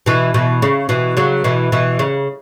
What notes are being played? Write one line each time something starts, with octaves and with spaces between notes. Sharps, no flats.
B2 E3
B2 E3
C#3
B2 E3
C#3 F#3
B2 E3
B2 E3
C#3